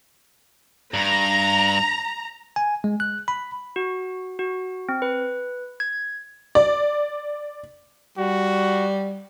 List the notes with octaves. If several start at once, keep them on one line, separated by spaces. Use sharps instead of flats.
G2 A#5
G#5
G#3
F#6
B5
F#4
F#4
C4
B4
G#6
D5
G3 F#4